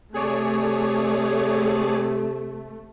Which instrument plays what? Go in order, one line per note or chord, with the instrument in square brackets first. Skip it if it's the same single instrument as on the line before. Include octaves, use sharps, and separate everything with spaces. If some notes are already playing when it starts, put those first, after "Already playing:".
[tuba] C3 [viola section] A3 [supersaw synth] G#4 C#5 D5